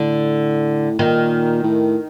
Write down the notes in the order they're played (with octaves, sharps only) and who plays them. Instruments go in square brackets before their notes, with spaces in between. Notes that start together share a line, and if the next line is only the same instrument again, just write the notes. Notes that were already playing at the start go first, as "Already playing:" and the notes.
Already playing: [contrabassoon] A2 [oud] D3
[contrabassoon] A#2 [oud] D#3
[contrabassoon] A2